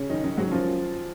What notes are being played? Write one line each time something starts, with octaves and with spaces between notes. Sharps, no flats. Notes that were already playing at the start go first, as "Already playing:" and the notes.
Already playing: C#3 C#4
F#2 D#3 D#4
F#2 D#3 D#4
G#2 F#3 F#4
F#2 F3 F4